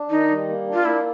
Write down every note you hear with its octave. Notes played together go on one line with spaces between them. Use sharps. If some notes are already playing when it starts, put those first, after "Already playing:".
Already playing: D4
D#3 D#4
G3
A#3
D4
F4
A#3 E4